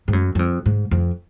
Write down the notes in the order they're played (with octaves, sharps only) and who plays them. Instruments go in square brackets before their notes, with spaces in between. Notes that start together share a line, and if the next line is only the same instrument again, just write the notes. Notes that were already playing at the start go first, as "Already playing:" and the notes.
[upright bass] G#2
F#2
F#2
F2
G#2
F2